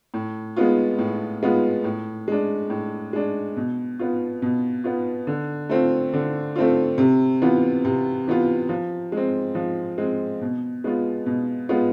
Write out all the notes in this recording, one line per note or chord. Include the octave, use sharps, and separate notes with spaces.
A2
G#3 B3 F4
A2
G#3 B3 F4
A2
G#3 D4
A2
G#3 D4
B2
B3 F4
B2
B3 F4
D3
A3 C4 F4
D3
A3 C4 F4
C3
E3 B3 F4
C3
E3 B3 F4
F3
G#3 C4
F3
G#3 C4
B2
G#3 B3 F4
B2
G#3 B3 F4